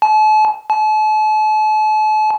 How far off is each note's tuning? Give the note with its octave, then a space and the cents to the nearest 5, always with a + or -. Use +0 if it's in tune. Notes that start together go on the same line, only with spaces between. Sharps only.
A5 -40
A5 -40